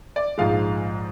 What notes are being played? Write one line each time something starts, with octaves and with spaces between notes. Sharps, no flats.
D5
A#1 G#2 F3 G#3 F5